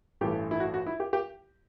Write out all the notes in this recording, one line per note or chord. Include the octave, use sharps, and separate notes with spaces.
A1 G2 E3 A3 G4
E4
F#4
F#4
E4
G4
G4